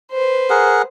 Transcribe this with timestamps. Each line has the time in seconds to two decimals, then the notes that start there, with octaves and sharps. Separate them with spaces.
0.11 B4 C5
0.50 G#4 A#4 F#5